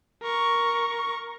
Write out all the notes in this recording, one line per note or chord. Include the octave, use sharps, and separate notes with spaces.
A#4 C#6